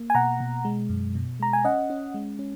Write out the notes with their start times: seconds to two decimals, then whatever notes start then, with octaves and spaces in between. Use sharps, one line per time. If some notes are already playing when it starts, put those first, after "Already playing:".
Already playing: A#3
0.10 G#5
0.15 B2 F#5 A#5
0.40 B2
0.65 G#3
0.89 F#2
1.15 B2
1.40 G#3 A#5
1.53 G#5
1.65 C#4 D#5 F#5
1.90 C#4
2.14 G#3
2.39 C#4